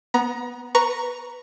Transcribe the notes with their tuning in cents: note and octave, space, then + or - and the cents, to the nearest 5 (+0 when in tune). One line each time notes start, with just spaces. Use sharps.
B3 +0 A#5 +30
B4 -5 A#5 +0 C#6 +0